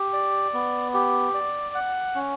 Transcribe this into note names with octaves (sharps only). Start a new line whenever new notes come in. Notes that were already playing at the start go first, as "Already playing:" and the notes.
Already playing: G4
D5
B3
G4
D5
F#5
C#4